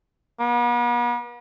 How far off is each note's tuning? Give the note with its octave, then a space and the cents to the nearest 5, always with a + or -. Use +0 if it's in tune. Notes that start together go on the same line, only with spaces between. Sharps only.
B3 -45